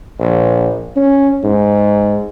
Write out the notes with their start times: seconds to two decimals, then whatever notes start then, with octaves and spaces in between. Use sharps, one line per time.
0.19 A#1
0.96 C#4
1.44 G#2